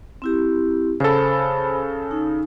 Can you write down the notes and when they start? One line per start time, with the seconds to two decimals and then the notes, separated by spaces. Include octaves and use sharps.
0.22 C4 E4 G4
1.00 C#3 A4 C5 B5
2.11 D#4